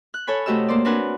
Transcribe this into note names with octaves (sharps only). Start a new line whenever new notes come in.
F#6
A4 C#5 G#5 B5
C3 A3 F#4 G4 D#5 E6
A#3 C5 D5
C4 D4 A#4 B4 F#5 G#5